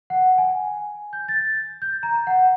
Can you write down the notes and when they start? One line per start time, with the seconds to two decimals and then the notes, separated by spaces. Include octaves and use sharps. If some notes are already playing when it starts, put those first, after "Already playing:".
0.10 F#5
0.38 G#5
1.13 G6
1.28 A6
1.82 G6
2.03 A#5
2.27 F#5